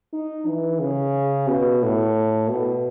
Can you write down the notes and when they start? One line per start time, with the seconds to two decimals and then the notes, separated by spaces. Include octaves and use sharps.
0.13 D#4
0.47 E3
0.80 C#3
1.48 B2
1.83 A2
2.49 B2